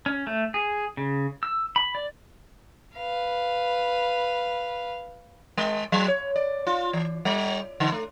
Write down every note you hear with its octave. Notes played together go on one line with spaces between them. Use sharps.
C#4
A3
G#4
C#3
E6
B5
D5
B4 F5
G#3
F#3
C#5
D5
F4
E3
G3
D3
A3